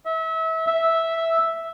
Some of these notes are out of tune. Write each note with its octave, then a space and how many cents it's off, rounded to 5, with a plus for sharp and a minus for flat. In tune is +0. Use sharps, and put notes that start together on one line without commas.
E5 -30
E5 -5